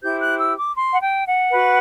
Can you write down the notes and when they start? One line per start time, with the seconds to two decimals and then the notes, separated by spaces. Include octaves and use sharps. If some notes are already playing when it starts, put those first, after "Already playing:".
0.01 E4 G4 C5 G6
0.20 F#6
0.39 E6
0.57 D6
0.75 C6
0.91 F#5
1.01 G5
1.26 F#5
1.51 F#4 B4